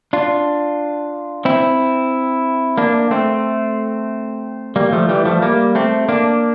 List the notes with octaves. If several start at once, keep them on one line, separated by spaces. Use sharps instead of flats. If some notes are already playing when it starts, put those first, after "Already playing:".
D4 F4
C4 E4
A#3 D4
A3 C4
G3 A#3
F3 A3
E3 G3
F3 A3
G3 A#3
A3 C4
A#3 D4